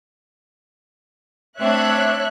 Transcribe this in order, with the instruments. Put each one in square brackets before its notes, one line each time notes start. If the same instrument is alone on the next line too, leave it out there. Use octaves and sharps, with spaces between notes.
[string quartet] A3 C4 D4 [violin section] C#5 E5 F#6